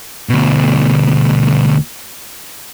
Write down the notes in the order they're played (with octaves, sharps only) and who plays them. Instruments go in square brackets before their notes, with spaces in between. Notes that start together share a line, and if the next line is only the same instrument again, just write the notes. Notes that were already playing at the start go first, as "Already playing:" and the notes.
[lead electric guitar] D2 B2